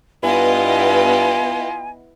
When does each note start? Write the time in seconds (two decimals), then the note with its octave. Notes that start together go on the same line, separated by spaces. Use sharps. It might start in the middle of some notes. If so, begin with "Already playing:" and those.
0.23 G2 B3 E4 F4 D#5 G#5